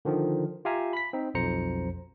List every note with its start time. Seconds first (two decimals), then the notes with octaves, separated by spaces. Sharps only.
0.05 D3 D#3 F3
0.65 F4 G4 E5 F5 G#5 A#5
0.93 B5 B6
1.13 C4 D#4
1.34 B1 F2 F3 C5 A#5 C#7